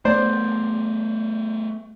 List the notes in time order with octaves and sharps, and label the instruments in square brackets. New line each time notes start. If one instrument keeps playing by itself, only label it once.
[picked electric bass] A3 B3 [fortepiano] C5 D5